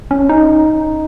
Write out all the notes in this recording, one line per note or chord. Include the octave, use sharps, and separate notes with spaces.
C#4
D#4